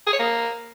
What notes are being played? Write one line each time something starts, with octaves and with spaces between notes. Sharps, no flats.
G#4
C#5
A#3